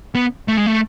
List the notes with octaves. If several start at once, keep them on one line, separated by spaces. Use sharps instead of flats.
B3
A3
G#3
A3